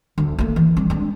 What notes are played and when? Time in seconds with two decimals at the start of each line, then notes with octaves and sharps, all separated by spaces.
0.18 D2
0.39 A3 A#3
0.56 E3
0.77 G3 C4
0.90 G#3 D4